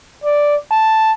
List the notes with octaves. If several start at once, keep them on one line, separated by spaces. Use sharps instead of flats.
D5
A5